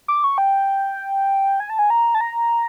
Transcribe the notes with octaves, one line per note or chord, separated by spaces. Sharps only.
D6
C#6
G5
G#5
A5
G#5
A#5
A5
A#5